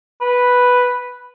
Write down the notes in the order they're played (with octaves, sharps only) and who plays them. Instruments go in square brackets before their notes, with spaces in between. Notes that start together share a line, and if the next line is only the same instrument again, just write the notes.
[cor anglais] B4